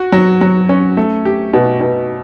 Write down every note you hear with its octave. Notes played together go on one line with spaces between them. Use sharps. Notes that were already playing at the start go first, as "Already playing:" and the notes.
Already playing: F#4
F#3
F#3
C#4
A3
G4
B2
B2